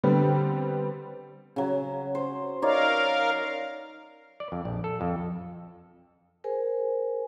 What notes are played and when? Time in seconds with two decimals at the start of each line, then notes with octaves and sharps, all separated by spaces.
0.03 D3 G3 B3 C4
1.56 C#3 F#3
2.15 C5
2.62 D#4 A#4 C#5 D5 F5
4.40 D5
4.52 F2
4.65 A#1
4.84 A4
5.01 F2
6.44 G#4 A#4 C5 G#5